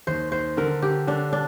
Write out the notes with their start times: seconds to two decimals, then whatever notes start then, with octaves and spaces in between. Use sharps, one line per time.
0.07 D#2 C5
0.32 D#2 C5
0.57 D3 A#4
0.82 D3 G4
1.07 D3 D4
1.33 D4